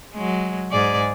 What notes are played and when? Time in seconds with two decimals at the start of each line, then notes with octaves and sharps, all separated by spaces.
0.14 F#3 G#3
0.71 G#2 G#4 D5